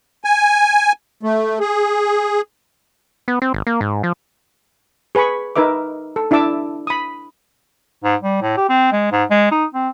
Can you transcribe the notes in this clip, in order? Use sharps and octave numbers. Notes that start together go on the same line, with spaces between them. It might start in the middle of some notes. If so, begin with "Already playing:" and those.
G#5
A3
G#4
B3
C4
G#1
A#3
G#2
F3
G#4 B4 G#5 B5 C#6
D#4 A#4 B4 E5 D6
A4
D4 E4 E5 A5 D6 E6
B5 D#6
G#2
G3
A2
G4
C4
G#3
G#2
G#3
D#4
C4